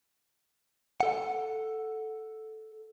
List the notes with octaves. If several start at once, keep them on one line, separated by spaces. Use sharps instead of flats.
A4 F#5